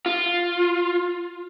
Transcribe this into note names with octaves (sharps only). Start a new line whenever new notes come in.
F4